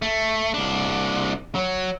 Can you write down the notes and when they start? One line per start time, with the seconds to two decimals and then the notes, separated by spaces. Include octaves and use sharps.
0.02 A3
0.54 C2 D4
1.55 F#3